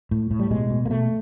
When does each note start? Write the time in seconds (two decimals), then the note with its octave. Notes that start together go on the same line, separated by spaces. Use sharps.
0.11 A2
0.31 A2
0.40 G3
0.51 B2 G#3
0.70 B2
0.85 A#3
0.90 B2 A3